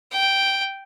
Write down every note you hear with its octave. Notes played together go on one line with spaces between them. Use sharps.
G5